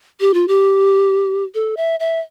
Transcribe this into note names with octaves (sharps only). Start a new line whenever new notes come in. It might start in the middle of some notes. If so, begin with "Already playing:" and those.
G4
F4
G4
A4
E5
E5